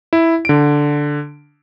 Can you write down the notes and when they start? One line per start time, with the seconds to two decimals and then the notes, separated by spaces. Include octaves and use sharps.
0.13 E4
0.45 D3 D7